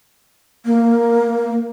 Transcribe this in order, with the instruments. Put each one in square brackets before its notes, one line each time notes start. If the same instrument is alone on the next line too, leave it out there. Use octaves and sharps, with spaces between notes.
[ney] A#3